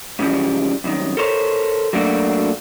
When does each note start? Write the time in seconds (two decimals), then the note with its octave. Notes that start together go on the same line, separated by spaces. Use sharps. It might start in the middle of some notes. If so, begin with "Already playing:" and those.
0.19 G#2 C#3 E3 F3 G3
0.84 C2 F#2 D#3
1.17 A4 A#4 C5 C#5
1.93 F#3 A3 A#3 D4 F#4